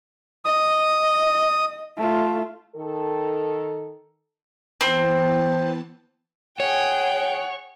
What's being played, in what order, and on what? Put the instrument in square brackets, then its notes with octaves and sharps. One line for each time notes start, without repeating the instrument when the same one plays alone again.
[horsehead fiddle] D#5 [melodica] D#6
[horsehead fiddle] A3 F4
[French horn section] D#3 A4
[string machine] E3 B3 A5 [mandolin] C4
[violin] G#4 G5 [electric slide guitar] C#5 [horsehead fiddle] F#5